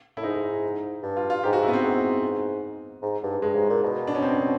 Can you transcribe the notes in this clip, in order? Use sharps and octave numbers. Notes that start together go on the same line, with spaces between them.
A2 E4
G#2 D#4
G2
F4
F4
G#2 G4
F#4
E4
B3
C4
G#2
G#2
G2
G2 G#3
G#2
A#2
B2
D4
C#4
C4